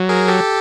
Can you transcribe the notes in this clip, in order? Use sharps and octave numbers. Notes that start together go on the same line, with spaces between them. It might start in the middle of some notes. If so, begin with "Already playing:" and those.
Already playing: F#3
G#4 A#4
G4 A4